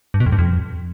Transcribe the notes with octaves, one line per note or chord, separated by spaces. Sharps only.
G2
B2
F2
G2
F2